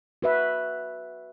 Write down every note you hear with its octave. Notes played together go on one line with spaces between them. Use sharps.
F#4 B4 E5